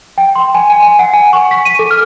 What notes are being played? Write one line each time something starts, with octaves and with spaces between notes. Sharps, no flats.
G5
C6
G#5
G#5
G#5
F#5
G#5
C#6
B6
D#7
A4
F6